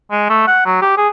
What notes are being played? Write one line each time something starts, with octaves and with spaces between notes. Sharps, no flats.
G#3
A3
F#5
F#3
G4
G#4